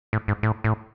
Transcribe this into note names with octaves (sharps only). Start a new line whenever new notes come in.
A2
G#2
A2
A2